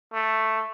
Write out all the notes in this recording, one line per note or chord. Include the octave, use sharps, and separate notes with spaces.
A3